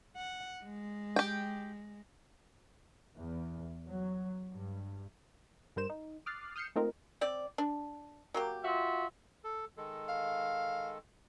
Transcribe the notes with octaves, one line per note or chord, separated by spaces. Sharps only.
F#5
G#3
G4 G5
E2
F#3
G2
G2 G3 A#4 C5 E7
D#4
D6 D#6 F6 F#6 A6 C7
D#6 F6 G6 C7 C#7 E7
A3 A#3 C4 D#4 F4 A#4
C4 D5
D4
F#3 A#3 G4
F4 F#4 E5
A4
D#3 G#3 A4
F5